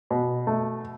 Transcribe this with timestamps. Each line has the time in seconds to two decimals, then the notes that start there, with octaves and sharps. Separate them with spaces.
0.11 B2
0.47 A3